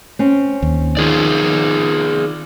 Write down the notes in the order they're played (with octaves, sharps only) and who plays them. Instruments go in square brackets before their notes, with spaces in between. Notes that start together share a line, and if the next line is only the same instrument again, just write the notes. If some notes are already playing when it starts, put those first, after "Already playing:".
[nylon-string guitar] C4 C#4
[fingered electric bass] D#2
[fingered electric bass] D#3 [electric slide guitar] F4 G#4 D5